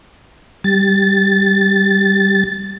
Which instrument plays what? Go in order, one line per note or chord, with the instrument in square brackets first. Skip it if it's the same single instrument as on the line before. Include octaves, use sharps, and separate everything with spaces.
[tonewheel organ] G3 A6